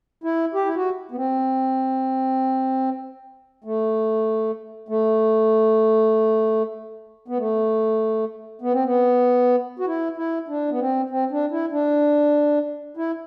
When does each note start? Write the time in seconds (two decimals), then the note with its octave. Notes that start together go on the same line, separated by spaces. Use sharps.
0.24 E4
0.54 G4
0.65 E4
0.75 F#4
1.11 B3
1.16 C4
3.64 A3
4.89 A3
7.28 B3
7.38 A3
8.61 B3
8.73 C4
8.84 B3
9.79 F#4
9.87 E4
10.17 E4
10.48 D4
10.71 B3
10.80 C4
11.10 C4
11.31 D4
11.51 E4
11.72 D4
12.97 E4